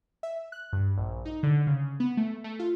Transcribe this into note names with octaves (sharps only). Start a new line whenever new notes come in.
E5
F#6
G2
A#1
D#4
D3
C#3
B3
A3
A3
F4